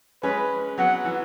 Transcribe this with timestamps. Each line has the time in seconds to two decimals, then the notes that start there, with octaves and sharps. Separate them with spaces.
0.23 G#3 C#4 B4
0.78 F#3 B3 F#5
1.05 E3